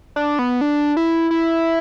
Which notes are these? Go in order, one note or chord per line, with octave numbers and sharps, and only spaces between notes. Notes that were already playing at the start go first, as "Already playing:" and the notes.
D4
B3
D4
E4
E4